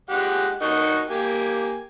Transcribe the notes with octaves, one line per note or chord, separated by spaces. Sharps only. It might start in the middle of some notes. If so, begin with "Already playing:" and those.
G#3 G4 F#5
D#4 F#4 A#4
A#3 G4 G#5